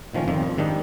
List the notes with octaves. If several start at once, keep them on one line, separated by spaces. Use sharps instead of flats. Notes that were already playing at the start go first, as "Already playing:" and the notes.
A#2 D#3 F3 A3 C#4
F2 C3 D#3 F3 G3
F2
G#2 D#3 G3 D4 D#4